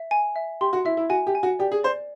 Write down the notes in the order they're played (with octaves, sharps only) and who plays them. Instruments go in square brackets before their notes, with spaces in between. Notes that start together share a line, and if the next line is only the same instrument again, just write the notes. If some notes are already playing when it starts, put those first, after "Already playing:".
Already playing: [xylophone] E5
G#5
E5
[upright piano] G4 [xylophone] C6
[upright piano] F#4
[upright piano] E4 [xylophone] E5
[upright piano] E4
[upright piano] F#4 [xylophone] G#5
[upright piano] G4
[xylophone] G#5
[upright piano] F#4
[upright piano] G4 [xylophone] D5
[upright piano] G#4
[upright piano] C5 [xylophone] D5